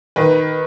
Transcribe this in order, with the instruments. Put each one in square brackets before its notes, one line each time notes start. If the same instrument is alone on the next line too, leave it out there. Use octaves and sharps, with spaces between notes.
[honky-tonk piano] D#3 B4